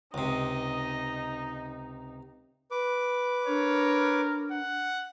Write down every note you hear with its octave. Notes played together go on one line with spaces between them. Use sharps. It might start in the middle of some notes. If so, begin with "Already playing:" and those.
C#2 C3 D#4 D#5
B4 D6
D4 A#4 C#5
F#5